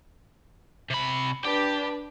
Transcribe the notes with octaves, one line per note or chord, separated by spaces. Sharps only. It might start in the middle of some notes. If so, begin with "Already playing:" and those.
C3 B5
D4 G4 B4